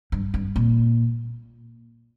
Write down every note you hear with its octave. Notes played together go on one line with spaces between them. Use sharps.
G2
G2
A#2